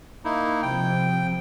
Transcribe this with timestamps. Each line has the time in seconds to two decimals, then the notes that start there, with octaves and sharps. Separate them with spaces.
0.25 A#3 D#4 E4
0.62 C3 F3 G5